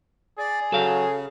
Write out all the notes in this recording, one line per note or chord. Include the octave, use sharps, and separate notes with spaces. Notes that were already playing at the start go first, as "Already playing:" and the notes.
G#4 D5
C#3 F#3 A4 F5